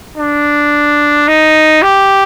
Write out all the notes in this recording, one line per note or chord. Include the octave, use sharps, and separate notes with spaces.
D4
D#4
G4